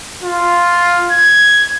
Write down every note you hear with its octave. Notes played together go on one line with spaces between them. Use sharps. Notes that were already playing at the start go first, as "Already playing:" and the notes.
F4
G#6